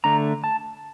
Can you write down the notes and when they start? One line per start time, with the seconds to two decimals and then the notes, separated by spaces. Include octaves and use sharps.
0.04 D3 A3 D4 A#5
0.44 A5